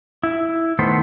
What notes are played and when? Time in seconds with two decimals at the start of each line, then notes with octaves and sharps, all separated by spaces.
0.23 E4
0.79 D#3 A3 B3 A4 C5